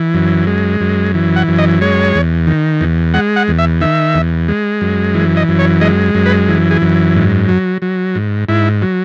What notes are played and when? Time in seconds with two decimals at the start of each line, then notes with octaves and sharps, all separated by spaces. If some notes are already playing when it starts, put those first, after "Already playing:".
Already playing: E3
0.14 F#2
0.47 G#3
0.80 F#2
1.14 E3
1.36 F#5
1.48 F#2
1.58 D#5
1.81 G#3 C#5
2.15 E2
2.47 D#3
2.81 E2
3.14 G#3 F#5
3.36 F#5
3.48 E2
3.58 E5
3.81 D#3 E5
4.14 E2
4.48 G#3
4.81 F#2
5.14 E3
5.37 D#5
5.48 F#2
5.59 C#5
5.81 G#3 D#5
6.14 F#2
6.26 B4
6.48 E3
6.71 G#4
6.82 F#2
7.15 G#2
7.48 F#3
7.82 F#3
8.15 G#2
8.49 G#2 E4
8.82 F#3